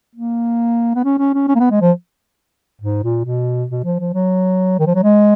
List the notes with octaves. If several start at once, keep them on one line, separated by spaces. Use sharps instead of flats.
A#3
B3
C#4
C#4
C#4
C#4
A#3
B3
G#3
F3
G#2
A#2
B2
B2
F3
F3
F#3
D#3
F3
F#3
G#3